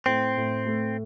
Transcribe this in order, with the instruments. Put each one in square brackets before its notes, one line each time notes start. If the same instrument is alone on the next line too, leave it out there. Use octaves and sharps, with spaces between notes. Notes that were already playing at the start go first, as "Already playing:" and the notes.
[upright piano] A2 [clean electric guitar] C4
[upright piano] A2
A3